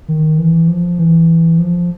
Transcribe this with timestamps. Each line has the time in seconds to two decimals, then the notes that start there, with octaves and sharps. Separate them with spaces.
0.08 D#3
0.38 E3
0.68 F3
0.98 E3
1.59 F3